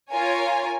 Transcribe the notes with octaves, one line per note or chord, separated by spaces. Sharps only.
F4 A#4 C#5 G#5